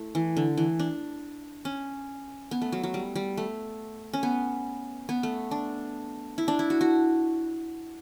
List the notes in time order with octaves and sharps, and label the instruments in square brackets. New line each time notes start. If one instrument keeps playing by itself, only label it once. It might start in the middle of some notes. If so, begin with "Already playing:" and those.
Already playing: [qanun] A3 E4
E3
D3
E3
D4
C#4
B3
A3
F#3
F#3
G3
G3
A3
C#4
B3
B3
A3
D4
E4
D4
E4
F#4
F#4